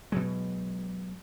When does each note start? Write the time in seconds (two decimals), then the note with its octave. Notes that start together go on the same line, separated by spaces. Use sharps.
0.12 B2 F#3 G#3